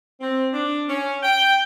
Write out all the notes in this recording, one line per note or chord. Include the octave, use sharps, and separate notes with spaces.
C4
D4
C#4
G5